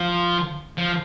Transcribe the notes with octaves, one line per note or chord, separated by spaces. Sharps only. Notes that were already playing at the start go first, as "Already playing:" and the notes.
Already playing: F3
F3